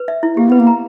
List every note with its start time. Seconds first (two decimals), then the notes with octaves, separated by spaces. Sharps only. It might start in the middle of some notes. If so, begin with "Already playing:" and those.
Already playing: B4
0.08 E5
0.23 E4
0.37 A#3 G4
0.49 B3 B4
0.59 A#3
0.67 A#5